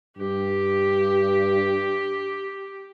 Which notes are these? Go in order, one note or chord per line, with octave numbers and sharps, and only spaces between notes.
G2 G4